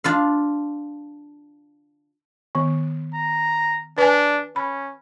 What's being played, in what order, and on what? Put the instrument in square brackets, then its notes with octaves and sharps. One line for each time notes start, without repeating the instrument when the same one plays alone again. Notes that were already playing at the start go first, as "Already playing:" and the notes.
[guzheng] D4 F4 F5
[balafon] D#3 B3
[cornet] A#5
[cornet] D4 [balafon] B4 G#5
[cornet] C#4 [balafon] B5